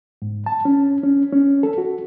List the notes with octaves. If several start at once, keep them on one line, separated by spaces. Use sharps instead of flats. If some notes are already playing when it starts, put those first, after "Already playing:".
G#2
A5
C#4
C#4
C#4
A4
F#4